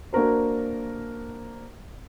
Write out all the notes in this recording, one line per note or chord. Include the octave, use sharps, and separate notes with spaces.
A#3 D4 F#4 A#4 C5